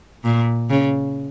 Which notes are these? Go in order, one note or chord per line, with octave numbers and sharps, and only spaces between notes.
A#2
C#3